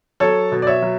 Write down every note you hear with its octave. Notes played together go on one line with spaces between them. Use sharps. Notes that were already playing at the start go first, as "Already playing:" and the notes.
F#3 A4 C#5
B2
D5
C#5 E5
F#3